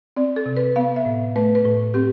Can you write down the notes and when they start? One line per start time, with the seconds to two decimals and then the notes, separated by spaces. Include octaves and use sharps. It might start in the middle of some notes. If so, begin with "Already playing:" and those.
0.17 C4 D5
0.36 A4
0.46 C3
0.57 B4
0.76 B3 F5
0.96 E5
1.05 A2
1.36 A3 B4
1.55 B4
1.65 A2
1.94 C4 G4